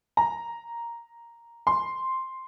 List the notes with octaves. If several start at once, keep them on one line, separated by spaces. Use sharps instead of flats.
A#5
C6